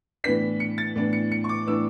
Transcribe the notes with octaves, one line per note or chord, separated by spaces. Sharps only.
A2 E3 B3 D4 B6
C#7
A6
A2 E3 B3 D4
C#7
C#7
C#6
D6
A2 E3 B3 D4 E6